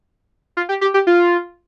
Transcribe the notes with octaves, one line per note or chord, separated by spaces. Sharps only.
F4
G4
G4
G4
F4